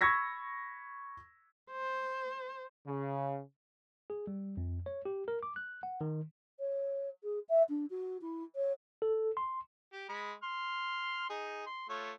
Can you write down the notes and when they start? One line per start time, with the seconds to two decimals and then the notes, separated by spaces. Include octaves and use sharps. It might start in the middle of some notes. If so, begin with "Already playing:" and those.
0.01 B5 C#6 E6 G#6 A#6 B6
1.71 C5
2.88 C#3
4.10 G#4
4.27 G3
4.57 F2
4.86 C#5
5.05 G4
5.28 A#4
5.43 D6
5.56 F#6
5.83 F#5
6.01 D#3
6.60 C#5
7.23 G#4
7.49 E5
7.69 D4
7.90 F#4
8.21 E4
8.56 C#5
9.02 A4
9.37 C6
9.93 G4
10.09 G#3 B5
10.43 C6 F6
11.30 D#4 G#4
11.66 C6
11.89 A3 F4 C#5